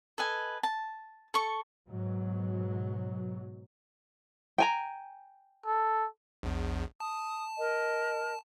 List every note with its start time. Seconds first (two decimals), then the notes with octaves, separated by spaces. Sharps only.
0.18 A4 B4 D#5 G#5
0.63 A5
1.34 A4 C#6
1.88 G#2 B2 F#3
4.58 G5 G#5 A#5
5.66 A4
6.43 A#1 E2
7.00 A5 D#6
7.58 A#4 D#5